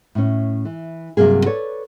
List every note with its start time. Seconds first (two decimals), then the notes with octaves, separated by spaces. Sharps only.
0.15 A2 C#4
0.65 E3
1.17 G2 C3 F#3 A#3 G#4
1.46 A4 B4 C#5 D5